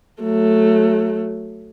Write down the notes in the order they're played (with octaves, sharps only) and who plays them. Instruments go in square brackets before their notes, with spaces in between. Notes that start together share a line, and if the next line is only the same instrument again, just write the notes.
[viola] F#3 A3